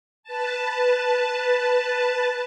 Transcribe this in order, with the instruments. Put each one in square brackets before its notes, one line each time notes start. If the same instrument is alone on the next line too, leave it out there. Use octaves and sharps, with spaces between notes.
[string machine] B4 A5